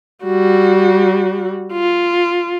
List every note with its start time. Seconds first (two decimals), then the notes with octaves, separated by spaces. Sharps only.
0.24 G3 F#4
1.74 F4